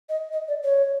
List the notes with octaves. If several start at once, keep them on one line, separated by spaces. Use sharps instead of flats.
D#5
D#5
D5
C#5